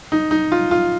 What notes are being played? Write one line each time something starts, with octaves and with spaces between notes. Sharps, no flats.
D#4
D#4
F4
F4